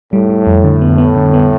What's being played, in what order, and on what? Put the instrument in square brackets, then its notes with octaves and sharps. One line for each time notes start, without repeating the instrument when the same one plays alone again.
[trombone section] A2 [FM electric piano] G3
[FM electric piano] G3
F2
D3
B3
B3
D3
B3